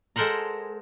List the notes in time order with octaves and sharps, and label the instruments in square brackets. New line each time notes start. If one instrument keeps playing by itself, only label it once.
[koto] G#3 A4 A#4 C5 F#5 A#5